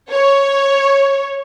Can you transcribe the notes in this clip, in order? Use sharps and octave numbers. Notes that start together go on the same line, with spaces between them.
C#5